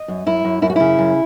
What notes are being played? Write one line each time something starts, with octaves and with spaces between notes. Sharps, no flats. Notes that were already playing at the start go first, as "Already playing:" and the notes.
Already playing: D#5
F#2
F#2 E4
F#2
F#2 E4
F#4
C#3 E4
F#2